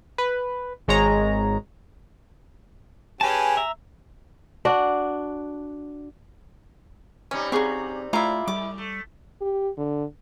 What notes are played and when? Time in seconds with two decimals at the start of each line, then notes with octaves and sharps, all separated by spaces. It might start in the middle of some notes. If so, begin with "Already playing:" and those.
0.18 B4
0.88 G#1 G#3 C#5 A#5
3.21 C#4 G4 G#4 B4 G#5 A5
3.57 E5 A#5
4.65 D4 F#4
7.31 C3 G3 C#4 D#4
7.52 C#3 F#3 C4 G#4 C#6
8.13 G#3 A3 E4 F4 A#5 D6
8.48 A2 G3 D6
8.78 A3
9.41 G4
9.77 D3